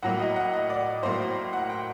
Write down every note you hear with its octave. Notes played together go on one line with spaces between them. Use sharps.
A2 F#3 A#3 F#5
D#5
F#5
D#5
D5
A2 F#3 A#3 C5
F#5
G5